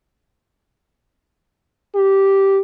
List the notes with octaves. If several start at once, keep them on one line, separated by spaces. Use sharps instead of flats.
G4